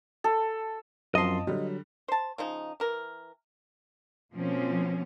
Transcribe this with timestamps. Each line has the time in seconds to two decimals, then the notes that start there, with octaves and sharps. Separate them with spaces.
0.24 A4
1.15 F#2 F3 C4 D#5 A5 C6
1.47 D3 F#3 G3
2.08 C5 A5
2.38 C#3 F3 D#4
2.80 E3 A#4
4.34 B2 F3 A#3 C4 C#4